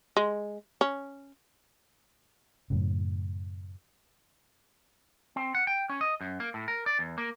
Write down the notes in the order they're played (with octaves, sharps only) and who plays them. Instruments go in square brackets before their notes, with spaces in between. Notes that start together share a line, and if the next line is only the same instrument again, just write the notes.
[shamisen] G#3
C#4
[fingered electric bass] F#2 A2 C#3
[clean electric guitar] C4
F#5
G5
C#4
D#5
F#2
A#3
A2
A#4
D5
E2
A#3